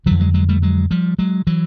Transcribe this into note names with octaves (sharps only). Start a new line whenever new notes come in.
F2 D3 E3 F#3
F#3 G#3
F#3 G#3
G3 A3
F#3 G#3
F3 G3
F#3 G#3
E3 F#3